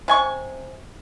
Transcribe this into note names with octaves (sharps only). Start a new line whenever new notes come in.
C3 G#5 C#6